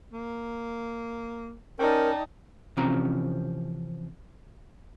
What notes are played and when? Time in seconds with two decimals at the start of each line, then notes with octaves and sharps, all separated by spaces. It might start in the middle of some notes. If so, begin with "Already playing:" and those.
0.12 A#3
1.79 C#4 D#4 A#4 D5 G5 A5
2.77 C3 E3 F3 C4 C#4 A#5